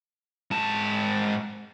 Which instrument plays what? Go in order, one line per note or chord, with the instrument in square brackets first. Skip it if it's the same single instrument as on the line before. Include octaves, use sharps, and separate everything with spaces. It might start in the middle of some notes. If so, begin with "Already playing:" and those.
[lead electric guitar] G#2 A5